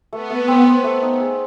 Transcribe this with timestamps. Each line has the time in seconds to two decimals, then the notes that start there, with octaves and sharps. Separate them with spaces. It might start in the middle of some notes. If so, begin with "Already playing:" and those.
0.12 A3 B3
0.30 A3
0.48 C4
0.66 C4
0.84 A3
1.03 D#4
1.20 G#4